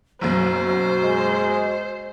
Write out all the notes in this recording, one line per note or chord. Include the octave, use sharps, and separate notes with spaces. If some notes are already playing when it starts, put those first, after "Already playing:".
F#1 B1 F#2 F#4 C5
G#3